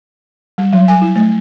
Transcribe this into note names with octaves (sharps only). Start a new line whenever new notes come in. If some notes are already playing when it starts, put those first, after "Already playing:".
G3
F#3
G#5
E4
A3